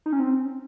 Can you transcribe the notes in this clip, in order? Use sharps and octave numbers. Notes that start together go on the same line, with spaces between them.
D#4
C#4
C4